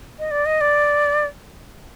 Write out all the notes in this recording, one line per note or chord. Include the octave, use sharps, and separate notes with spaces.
D#5
D5
D#5
D5